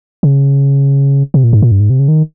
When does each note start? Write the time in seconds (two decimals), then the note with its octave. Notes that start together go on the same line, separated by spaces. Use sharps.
0.23 C#3
1.34 C3
1.44 A#2
1.53 G#2
1.62 A#2
1.72 G2
1.80 G#2
1.90 C3
1.99 C#3
2.08 D#3